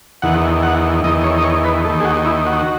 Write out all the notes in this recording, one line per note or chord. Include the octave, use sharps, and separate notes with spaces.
E2 D#3 F#5
F#5
E2 D#3 D#5
C#5
D#5
C#5
B4
D#2 D#3 A4
G#4
F#4
E4
F#4